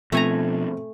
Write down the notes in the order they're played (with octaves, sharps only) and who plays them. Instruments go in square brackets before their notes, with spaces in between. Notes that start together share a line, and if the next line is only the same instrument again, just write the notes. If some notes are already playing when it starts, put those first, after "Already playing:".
[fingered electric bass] B2 F3 [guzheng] A3 G#5 A#5 [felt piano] C4